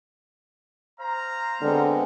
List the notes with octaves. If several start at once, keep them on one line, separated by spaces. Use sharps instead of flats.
C5 F5 A#5
D3 G#3 B3 C4